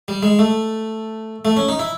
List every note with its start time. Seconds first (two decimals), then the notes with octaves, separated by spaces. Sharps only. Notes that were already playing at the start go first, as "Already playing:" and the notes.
0.08 G3
0.23 G#3
0.39 A3
1.45 A3
1.57 C#4
1.69 D#4
1.79 E4